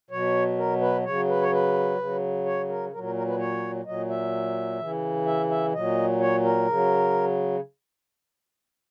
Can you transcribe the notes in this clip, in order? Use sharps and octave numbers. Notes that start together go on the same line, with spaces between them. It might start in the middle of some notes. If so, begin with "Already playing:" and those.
B2 F#3 C#5
A#4
B4
C#3 F#3 C#5
B4
C#5
B4
C#3 F#3
C#5
A#4
A#2 F#3 A#4
A#4
A#4
B4
C#5
A#2 F#3 D#5
E5
C#3 E3
E5
E5
A#2 F#3 D#5
C#5
A#4
C#3 F#3